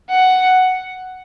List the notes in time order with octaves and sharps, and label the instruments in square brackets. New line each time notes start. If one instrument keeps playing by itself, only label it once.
[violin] F#5